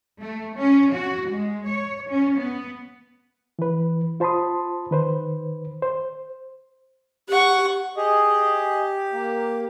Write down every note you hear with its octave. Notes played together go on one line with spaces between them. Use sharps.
A3
C#4
F#4
G#3
C#5
C#4
B3
E3 B4
F4 C5 A5 B5 C6 D#6
D#3 B4 C5
C5
G4 F#5 C#6
G4 G#4 D#5
A#3